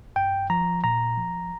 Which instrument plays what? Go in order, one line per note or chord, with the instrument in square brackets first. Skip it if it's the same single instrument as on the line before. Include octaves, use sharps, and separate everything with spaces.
[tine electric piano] G2 G5
F3 A#5
A#2 A#5
F3